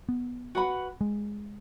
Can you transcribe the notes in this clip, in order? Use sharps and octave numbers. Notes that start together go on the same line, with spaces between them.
B3
F#4 B4 F#5 B5
G#3